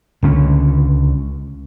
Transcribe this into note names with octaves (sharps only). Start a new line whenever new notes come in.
C#2 D3 C#4